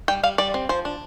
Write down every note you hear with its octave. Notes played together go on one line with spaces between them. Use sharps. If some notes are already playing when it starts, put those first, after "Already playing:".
G3 G5
G3 F5
G3 D5
C4
F3 C5
D4